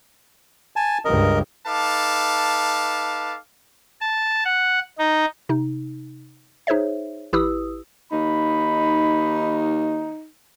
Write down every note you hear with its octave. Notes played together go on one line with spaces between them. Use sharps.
G#5 A5
C#2 G2 A#4 D#5
D#4 A4 B4 F5 A5 D6
A5
F#5
D#4
C3 D#4
D#4 G#4 C5 C#5 E5
A1 E4 G4 B4 D#6 E6
D#2 D#4 B5